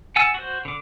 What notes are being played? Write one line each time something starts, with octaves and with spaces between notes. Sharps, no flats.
F#5 G#5 A5 E6
F#4 C5
D3 D6